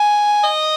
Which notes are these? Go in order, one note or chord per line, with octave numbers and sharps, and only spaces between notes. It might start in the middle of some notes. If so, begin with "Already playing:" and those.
Already playing: G#5
D#5